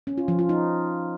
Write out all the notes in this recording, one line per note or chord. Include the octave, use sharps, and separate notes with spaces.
C#4
F4
F3
F4
D#4